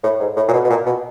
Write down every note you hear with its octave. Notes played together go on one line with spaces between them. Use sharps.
A2
G#2
A2
A#2
B2
B2
A#2
B2